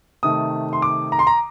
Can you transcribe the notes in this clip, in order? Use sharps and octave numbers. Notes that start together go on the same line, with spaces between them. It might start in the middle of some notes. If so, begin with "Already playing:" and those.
C3 D#3 A3 D#6
C6
D6
A#5
C6
A#5